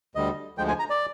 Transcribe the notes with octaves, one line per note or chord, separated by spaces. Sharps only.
D2 D3 G3 D#5
D2 D3 F3 G#3 G5
G#5
A#5
D5